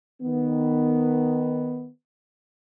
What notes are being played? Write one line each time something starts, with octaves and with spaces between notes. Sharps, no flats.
D#3 B3